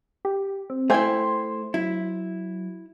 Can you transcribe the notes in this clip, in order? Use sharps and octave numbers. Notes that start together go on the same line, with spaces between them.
G4
C4
A3 E4 C5 G5 G#5 C6
F#3 E4